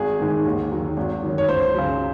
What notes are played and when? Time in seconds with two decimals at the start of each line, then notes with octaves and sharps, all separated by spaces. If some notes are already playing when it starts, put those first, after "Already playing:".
Already playing: G#1 G#4
0.20 G#2 D#3 G#3
0.46 D#2
0.71 D#3 F#3
0.97 G#1
1.22 F#2 D#3
1.38 C#5
1.48 C#2 C5
1.74 C#3 F#3